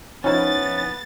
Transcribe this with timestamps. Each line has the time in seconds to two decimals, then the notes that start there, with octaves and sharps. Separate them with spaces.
0.24 F3 B3 C#4 D#4 E4 A6